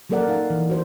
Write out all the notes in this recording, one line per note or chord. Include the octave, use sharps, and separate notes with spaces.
F#3 A#3 A4 A#4 D5 F#5
F#3 D#4 A#4 F5
E3
F#4 C5